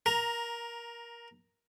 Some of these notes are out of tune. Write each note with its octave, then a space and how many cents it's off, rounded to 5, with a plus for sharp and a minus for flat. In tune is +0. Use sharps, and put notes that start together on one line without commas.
A#4 +15 A#5 +0